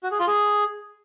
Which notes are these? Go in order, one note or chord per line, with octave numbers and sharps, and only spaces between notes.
F#4
G#4
F4
G#4